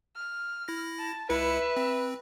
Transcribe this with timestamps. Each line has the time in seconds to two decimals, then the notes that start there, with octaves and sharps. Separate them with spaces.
0.16 F6
0.68 E4 A#6
0.98 A5
1.30 C#2 E4 B4 E5 C#7
1.77 C4